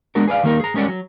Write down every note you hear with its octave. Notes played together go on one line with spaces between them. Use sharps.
G#3 B3 D4 F#4 A#4
G#4 B4 D5 F5
D#3 G3 A#3 D#4 G4 A#4
G#4 A#5
G3 G#3 C#4 A#4 D5 F#5
F#3